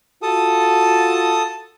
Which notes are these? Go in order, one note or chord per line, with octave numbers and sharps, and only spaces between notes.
F4 F#4 A4 A5 D#6